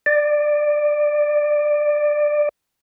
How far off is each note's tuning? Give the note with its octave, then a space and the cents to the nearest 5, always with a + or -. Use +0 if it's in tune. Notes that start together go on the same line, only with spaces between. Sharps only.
D5 +15